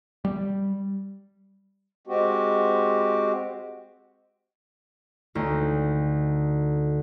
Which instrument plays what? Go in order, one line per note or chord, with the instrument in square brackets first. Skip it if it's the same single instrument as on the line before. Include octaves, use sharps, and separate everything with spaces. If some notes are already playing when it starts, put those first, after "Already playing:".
[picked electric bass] G3
[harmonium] G#3 C4 F#4 G4
[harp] D2 D#4